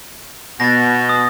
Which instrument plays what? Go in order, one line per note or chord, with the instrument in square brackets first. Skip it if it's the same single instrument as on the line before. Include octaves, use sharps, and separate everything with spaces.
[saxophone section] B2 [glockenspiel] A6 A#6
[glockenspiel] D#6